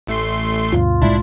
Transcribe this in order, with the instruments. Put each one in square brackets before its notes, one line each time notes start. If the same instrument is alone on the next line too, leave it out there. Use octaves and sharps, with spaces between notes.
[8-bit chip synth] A1 A3 C6
[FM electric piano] D2 G2 B2 [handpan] F4
[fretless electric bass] C2 A2 G#3 [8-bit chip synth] D4 E4